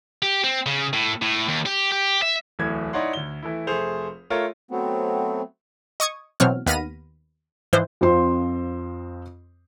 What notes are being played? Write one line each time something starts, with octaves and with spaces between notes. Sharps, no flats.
G4
C4
C#3
A2
A2
D#2
G4
G4
E5
D1 E2 A2 A3 G#6
D#4 E4 C#5 D5 F#5 C6
D2 G7
E3 A3 E4
F1 A3 G#4 C5 F7
A3 F4 A#4 C#5
F#3 A3 B3 C4
D#5 C#6 D#6 G#6
B2 E3 F#3 C4 C#5 F6
D#2 B3 B5 F6 A#6 D#7
G#2 E3 F3 C5
F2 F3 C4 C5 C6